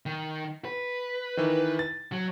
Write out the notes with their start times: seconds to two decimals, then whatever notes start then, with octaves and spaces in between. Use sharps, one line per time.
0.06 D#3
0.65 B4
1.37 D#3 E3
1.79 A6
2.12 F#3